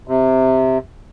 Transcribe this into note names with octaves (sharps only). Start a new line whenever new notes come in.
C3